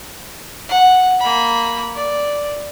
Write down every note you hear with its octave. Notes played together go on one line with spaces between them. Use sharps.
F#5
A#3 B5
D5